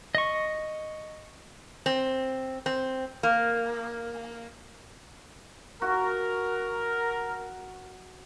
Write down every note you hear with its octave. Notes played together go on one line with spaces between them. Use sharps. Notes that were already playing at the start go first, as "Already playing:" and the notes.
D#5 C#6
C4
C4
A#3
F#4 A#4